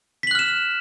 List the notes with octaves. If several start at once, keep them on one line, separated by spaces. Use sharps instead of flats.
F6 F#6 B6 E7 F#7